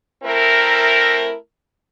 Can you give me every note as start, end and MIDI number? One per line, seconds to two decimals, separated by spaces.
0.24 1.34 57
0.24 1.34 60
0.24 1.34 64
0.24 1.34 70